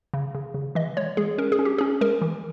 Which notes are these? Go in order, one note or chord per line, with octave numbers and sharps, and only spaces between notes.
C#3
C#3
C#3
E3 D#5
G#3 C#5
G#3 G#4
C#4 A#4
G#4
C#4
G4
C#4 G#4
G#3 A#4
E3